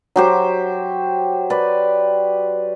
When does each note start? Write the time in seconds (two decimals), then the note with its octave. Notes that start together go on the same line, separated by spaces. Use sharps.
0.16 F#3 G4 C5
1.50 B4 D5